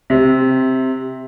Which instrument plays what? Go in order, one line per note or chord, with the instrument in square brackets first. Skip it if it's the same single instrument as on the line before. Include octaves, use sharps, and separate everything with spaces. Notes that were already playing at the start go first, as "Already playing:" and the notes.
[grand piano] C3